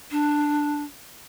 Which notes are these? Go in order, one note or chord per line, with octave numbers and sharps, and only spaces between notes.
D4